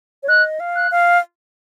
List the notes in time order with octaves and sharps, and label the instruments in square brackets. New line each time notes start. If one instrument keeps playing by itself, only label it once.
[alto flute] C#5
[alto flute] D#5 [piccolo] F#6
[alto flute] F5
[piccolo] F#6
[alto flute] F5